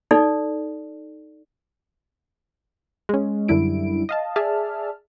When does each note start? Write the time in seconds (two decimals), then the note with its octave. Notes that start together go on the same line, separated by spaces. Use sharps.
0.11 D#4 A4 D5
3.09 G#3 C#4
3.48 F#2 D3 G3 E4 D7
4.09 D#5 F5 A5
4.36 G#4 D5 E5 A5 F6